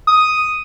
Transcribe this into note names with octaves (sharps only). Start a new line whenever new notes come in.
D#6